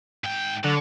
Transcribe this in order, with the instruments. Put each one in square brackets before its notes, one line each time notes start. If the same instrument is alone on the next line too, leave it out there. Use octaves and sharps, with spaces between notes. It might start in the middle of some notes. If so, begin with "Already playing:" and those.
[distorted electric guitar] G#2 G5
[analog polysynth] D3 [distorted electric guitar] F#3